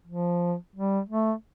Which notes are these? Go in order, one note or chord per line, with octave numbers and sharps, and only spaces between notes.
F3
G3
A3